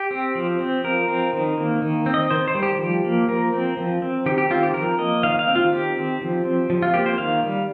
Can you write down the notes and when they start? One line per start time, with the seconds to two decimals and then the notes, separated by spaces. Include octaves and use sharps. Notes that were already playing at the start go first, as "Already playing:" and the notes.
Already playing: G4
0.11 C4
0.35 F3
0.61 C4
0.84 F3 A#4
1.08 C4
1.33 D#3
1.57 A#3
1.82 D#3
2.06 C4
2.14 D#5
2.30 D#3 C5
2.48 C5
2.55 G3
2.63 G4
2.79 F3
3.04 A#3
3.28 F3 A#4
3.53 C4
3.77 F3
4.02 C4
4.26 D#3 G4
4.38 G4
4.50 C4 F4
4.63 G4
4.74 F3 A#4
4.98 A#3 D#5
5.23 D#3 F5
5.39 F5
5.48 C4
5.55 F4
5.72 D#3 G4
5.96 C4
6.22 F3
6.45 C4
6.70 F3
6.82 F4
6.94 A#3 G4
7.06 C5
7.18 D#3 F5
7.43 G3